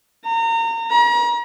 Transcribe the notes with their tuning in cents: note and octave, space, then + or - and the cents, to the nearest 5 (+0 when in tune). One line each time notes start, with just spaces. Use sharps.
A#5 -30
A#5 +40